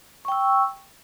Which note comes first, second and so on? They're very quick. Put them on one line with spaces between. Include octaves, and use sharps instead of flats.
C#6 G5 E6